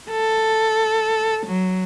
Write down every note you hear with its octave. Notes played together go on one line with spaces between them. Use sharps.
A4
F#3